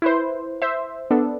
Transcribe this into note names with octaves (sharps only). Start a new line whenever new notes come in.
E4 B4 C5
C5 E5
B3 D4 A4